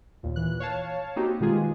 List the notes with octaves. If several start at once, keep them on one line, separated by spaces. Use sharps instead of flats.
D#2 A#2
A#2 E3 F#6
C#5 F5 A5
A#3 C4 D#4 F#4 G4
B2 D#3 G#3 F4 G4 G#4